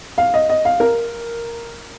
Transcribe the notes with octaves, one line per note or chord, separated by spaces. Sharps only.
F5
D#5
D#5
F5
A#4